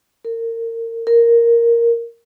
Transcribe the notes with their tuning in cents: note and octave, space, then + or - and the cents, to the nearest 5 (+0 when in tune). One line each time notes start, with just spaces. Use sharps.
A#4 -30
A#4 +0